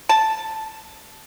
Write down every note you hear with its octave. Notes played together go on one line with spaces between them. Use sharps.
A5